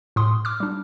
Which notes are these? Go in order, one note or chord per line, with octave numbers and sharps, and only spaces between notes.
A2 C6 D#6
D6 F6
G3 D4